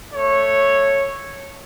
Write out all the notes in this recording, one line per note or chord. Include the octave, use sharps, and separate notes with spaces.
A3 C#5